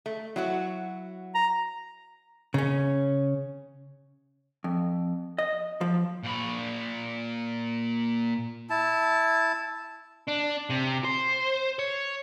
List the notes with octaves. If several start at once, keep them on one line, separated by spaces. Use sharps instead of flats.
A3
F#3 E4 F#4
A#5
C#3 C#4
F2
D#5
F3
A#2 B5
E4 A5
D4
C3
C5
C#5